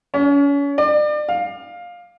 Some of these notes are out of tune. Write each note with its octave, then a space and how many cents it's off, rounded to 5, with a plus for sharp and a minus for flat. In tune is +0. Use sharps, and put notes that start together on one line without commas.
C#4 +35
D5 +35
F5 +10